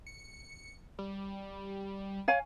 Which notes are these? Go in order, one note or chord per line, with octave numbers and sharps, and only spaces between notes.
C#7
G3
C#5 F5 G#5